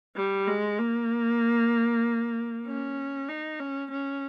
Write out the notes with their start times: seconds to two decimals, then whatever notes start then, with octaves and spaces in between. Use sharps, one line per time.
0.16 G3
0.47 G#3
0.78 A#3
2.66 C#4
3.29 D#4
3.60 C#4
3.91 C#4